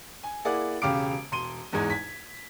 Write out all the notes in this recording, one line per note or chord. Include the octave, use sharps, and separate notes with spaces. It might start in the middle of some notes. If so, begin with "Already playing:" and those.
G#5
A#3 E4 G#4 D5 F#5
E1 C#3 G4 F5 D6 D7
E1 C6 D#7 G7
E2 G#2 G#3 D#4 G#6
G#6 B6